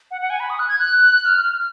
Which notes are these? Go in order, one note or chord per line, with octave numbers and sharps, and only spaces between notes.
F#5
F#5
G#5
B5
D#6
F#6
G#6
F#6
F6